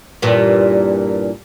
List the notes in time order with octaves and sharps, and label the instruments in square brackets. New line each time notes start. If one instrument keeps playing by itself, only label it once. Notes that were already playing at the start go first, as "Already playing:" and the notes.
[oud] G2 A#2 E3